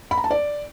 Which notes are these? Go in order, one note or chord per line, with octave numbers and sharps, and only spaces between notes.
B5
A#5
A5
D5